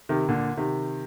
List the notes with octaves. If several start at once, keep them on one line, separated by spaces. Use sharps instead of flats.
C3 D#3
A#2 D3
C3 D#3